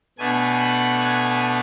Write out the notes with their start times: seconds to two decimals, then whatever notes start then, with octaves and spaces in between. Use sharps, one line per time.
0.18 B2 A3 D4 G#5
0.60 F#5
1.01 G#5